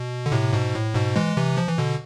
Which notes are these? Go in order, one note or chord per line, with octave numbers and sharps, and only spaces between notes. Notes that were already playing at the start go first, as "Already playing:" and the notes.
Already playing: B2
D3
A2 C3
G#2 B2
A2
G#2 B2
E3 G#3
C3 E3
F3
E3
B2 D3